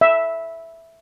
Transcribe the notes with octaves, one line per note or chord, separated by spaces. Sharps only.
E5